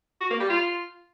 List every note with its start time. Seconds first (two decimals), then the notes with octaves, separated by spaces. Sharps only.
0.21 F#4
0.30 A#3
0.40 G3
0.50 F4